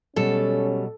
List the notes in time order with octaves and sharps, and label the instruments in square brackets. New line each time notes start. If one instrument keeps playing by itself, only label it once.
[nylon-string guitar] B2 F#3 [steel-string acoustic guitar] G3 [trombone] C#4 [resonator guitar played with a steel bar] A4